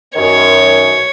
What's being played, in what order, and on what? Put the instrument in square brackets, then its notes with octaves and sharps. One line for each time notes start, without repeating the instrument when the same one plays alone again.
[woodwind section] F#2 D#3 [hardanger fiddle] C#5